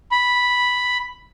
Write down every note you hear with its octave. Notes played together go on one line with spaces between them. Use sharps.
B5